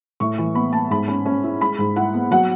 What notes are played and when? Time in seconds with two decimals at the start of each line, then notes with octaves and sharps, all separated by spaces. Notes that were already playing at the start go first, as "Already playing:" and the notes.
0.20 A2 C#6
0.38 E3
0.55 B3 B5
0.73 B3 A5
0.91 G#2 B5
1.08 C#4
1.25 C#4
1.44 E4
1.61 G#3 B5
1.79 G#2
1.96 E4 F#5
2.14 B3
2.31 F#3 F#5